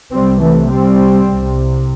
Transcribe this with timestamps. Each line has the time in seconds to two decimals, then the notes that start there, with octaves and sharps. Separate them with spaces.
0.12 C2 C3 G3 C4
0.41 E3 A3
0.69 G3 C4
1.27 C2 C3